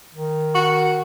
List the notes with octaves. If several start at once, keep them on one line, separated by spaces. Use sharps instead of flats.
D#3
F#4